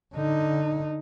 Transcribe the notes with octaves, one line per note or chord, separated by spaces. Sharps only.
D3 D#4